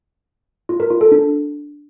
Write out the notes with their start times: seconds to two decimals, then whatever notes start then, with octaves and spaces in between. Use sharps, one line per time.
0.69 F4
0.80 A#4
0.90 F4
1.01 A4
1.12 D4